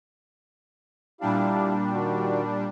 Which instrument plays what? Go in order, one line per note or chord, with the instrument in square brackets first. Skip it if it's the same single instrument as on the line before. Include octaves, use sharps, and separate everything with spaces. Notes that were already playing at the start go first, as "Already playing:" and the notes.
[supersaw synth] A#2 G3 D4 [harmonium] E4 G4 F5
[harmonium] D#3 F#4